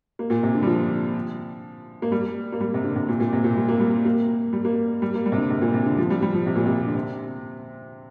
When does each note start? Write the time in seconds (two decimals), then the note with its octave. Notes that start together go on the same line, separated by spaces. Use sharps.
0.19 A#3
0.30 A#2
0.43 C3
0.55 D3
0.63 G3
0.67 F3
2.02 A#3
2.12 G3
2.52 A#3
2.61 G3
2.74 C3
2.84 D3
2.96 C3
3.09 A#2
3.20 A#2
3.33 C3
3.44 A#2
3.56 G3
3.68 A#3
3.80 G3
4.05 A#3
4.53 G3
4.65 A#3
5.02 G3
5.14 A#3
5.26 G3
5.32 C3
5.38 D3
5.50 C3
5.62 A#2
5.74 C3
5.86 D3
5.98 F3
6.10 G3
6.22 G3
6.35 F3
6.46 C3
6.55 A#2
6.66 C3
6.87 D3
6.95 C3